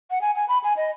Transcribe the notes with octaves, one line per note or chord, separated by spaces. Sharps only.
F#5
G#5
G#5
B5
G#5
D#5